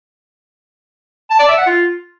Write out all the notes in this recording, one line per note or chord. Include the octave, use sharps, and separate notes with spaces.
A5
D5
E5
F#5
F4